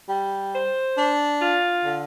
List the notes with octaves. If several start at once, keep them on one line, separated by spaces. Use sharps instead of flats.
G3
C5
D4
F4
D3